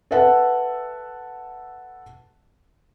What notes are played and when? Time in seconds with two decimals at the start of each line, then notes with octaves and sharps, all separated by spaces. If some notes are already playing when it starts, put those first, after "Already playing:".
0.11 A4 B4 E5 F#5 A5